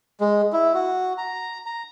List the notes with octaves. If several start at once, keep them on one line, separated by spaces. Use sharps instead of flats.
G#3
E4
F#4
A#5
A#5